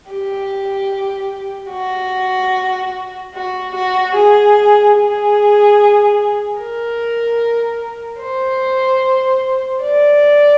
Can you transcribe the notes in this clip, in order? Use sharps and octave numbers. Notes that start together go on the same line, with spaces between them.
G4
F#4
F#4
F#4
G#4
G#4
A#4
C5
D5